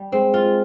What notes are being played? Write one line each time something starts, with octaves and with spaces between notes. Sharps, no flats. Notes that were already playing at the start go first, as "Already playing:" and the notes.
Already playing: G3
G#3 C4
F4